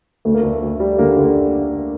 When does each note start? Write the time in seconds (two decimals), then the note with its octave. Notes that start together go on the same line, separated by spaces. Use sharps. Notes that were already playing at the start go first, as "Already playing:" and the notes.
0.25 D2 A3
0.34 A#3
0.43 D2 A3
0.62 D2
0.80 G3
0.99 D3 A#3
1.17 D3
1.24 A#3